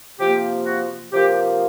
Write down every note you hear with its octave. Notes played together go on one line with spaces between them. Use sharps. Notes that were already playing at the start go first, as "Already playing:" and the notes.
C3 F3 A#3 G4
F#4
C3 F3 A#3 G4